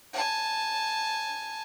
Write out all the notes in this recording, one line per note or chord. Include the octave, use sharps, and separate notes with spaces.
G#5 A5